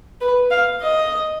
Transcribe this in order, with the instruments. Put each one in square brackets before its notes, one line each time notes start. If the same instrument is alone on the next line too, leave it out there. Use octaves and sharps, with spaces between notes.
[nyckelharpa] B4
F5
D#5